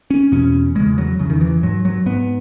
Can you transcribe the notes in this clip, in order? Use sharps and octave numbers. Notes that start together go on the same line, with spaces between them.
C#4
E2 B2 C#4
E2 C#3 G#3
F#3
E2 C#3
D#3
E3
G#2 F#3
F#3
G#2 B3